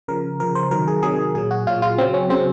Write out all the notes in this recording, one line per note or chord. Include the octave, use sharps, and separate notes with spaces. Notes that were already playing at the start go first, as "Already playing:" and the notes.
C#3 F3 A#4
C#3 F3 A#4
C5
C3 D#3 F#3 A#4
G#4
C3 D#3 F#3 G#4
A#2 F#3 G#4
F#4
A#2 F#3 F4
F4
C#3 F#3 C4
C#4
C#3 F#3 C4